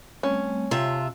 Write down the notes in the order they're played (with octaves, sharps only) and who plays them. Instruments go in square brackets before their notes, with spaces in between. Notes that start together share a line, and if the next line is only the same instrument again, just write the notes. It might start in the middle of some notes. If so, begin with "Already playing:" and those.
[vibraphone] G3 A3 C4 [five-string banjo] C#4
[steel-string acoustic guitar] C3 F4 E5 [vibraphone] A5